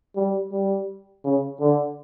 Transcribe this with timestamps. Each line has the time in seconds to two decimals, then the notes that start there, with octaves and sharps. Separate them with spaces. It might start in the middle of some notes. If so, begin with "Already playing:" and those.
0.16 G3
0.52 G3
1.24 C#3
1.60 D3